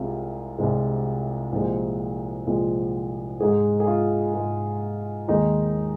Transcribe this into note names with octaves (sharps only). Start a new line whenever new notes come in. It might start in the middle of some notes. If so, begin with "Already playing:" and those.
Already playing: C2 C3 G#3 F4
C2 C3 G#3
C2 A#2 F3 G#3
C2 A#2 F3 G#3
G#2 G#3 G#4
G#4
F4
G#2 G#3
D#2 D#3 G#3 D#4